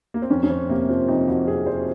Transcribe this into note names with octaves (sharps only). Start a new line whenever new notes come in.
A#3
C4
F2 C#4
C#4
F2 C4
C3 A#3
F3 C4
F2 D#4
F2 F#4
C3 G#4
F3 C5